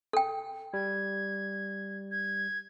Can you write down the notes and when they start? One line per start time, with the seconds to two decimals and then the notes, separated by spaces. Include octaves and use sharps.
0.13 A4 G5
0.74 G3 G#6
2.11 G#6